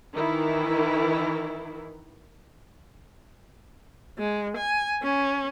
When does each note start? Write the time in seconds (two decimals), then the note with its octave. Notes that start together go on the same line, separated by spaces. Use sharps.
0.13 D#3 E3 E4
4.19 G#3
4.57 G#5
5.03 C#4